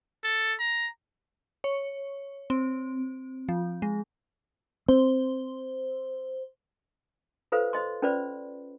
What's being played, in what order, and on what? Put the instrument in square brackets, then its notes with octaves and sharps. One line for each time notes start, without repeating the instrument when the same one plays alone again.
[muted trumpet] A4
A#5
[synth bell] C#5
C4
F3
G#3
[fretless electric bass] C4 [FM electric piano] C5
[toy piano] F4 A4 B4 C5 F5
C5 D#5 C6
C#4 F4 B4 C5 D5 B5